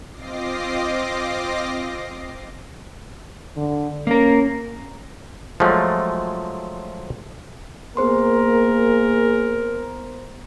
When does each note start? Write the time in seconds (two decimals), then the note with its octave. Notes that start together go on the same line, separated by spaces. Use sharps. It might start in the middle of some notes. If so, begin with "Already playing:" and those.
0.11 C4 F4 D#5 D6 A#6 C7
3.57 D3
4.07 A#3 C#4 A#4
5.60 F3 F#3 G#3 A3
7.97 A#3 B3 G#4 A#4 C5 C6